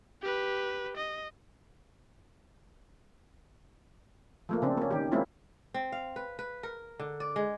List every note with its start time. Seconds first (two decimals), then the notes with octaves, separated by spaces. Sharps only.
0.22 G4 B4
0.97 D#5
4.49 F3 A3 A#3
4.62 C#3 C4 D4
4.77 A#3 C#4
4.91 D#3 G4
5.12 G#3 A#3 C4 C#4 E4 F4
5.74 C4
5.92 F5
6.16 B4
6.39 B4
6.63 A#4
6.99 D3
7.20 D5
7.36 G#3